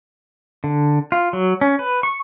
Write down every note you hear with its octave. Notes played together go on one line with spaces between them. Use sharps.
D3
F4
F#3
C#4
B4
C#6